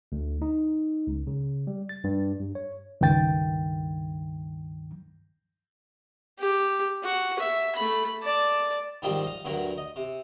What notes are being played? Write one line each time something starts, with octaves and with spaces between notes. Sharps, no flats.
D2
D#4
C#2
C#3
G3
A6
G2
G2
C#5
C#2 G2 D#3 G5 A6
G4
F#4
E5
A3 B5
D5 A5
G#2 D#3 F3 G3 C4 D#4
D#5 F5
D2 G2 D3 F#3 A#4 A#5
D#5
C3